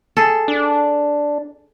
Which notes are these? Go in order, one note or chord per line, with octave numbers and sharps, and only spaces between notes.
G#4 A4
D4